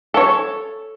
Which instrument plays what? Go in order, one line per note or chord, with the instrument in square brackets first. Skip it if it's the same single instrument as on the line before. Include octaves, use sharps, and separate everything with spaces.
[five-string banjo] A4 C#5